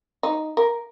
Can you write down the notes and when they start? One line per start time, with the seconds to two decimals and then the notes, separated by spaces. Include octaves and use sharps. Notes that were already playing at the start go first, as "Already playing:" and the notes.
0.23 D#4
0.57 A#4